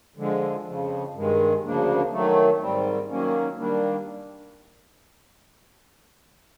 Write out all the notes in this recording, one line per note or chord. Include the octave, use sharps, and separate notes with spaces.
D3 F3 G#3
F2 C#3 F3
G2 D#3 G#3
D2 C#3 F3 A#3 D4
D#3 F#3 A3
G#2 D#3 G3 C4
D#3 F#3 A#3 C#4
D#3 G3 A#3 D4